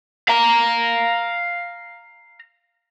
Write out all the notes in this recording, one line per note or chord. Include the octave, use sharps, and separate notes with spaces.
F5 A#5